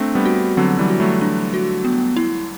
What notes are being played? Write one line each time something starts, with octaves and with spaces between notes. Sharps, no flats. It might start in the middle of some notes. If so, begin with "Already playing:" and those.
Already playing: A3 C4 D4
G3 B3
F#4
D3 F#3 C4
E3 G3
F#4
F#3 A3
D4
F#4
B3
E4